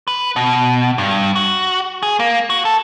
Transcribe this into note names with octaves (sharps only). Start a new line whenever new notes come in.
B4
B2
G2
F#4
G#4
A#3
F#4
A4